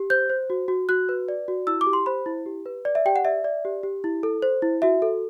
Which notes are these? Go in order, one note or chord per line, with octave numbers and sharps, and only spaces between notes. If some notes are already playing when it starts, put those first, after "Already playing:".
Already playing: G4
C5 G6
C5
F#4
F#4
F#4 F#6
B4
D5
F#4
E4 E6
D6
G4
C6
C5 B5
E4
G4
B4
D5
E5
G4 G5
F#5
D5 E5
D5
G4
G4
E4
A4
C5
E4
F#4 E5
A4